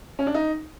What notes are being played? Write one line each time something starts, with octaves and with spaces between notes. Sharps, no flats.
C#4
D4
D#4